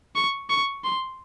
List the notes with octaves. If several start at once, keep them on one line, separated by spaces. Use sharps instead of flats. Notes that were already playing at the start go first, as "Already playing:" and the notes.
C#6
C#6
C6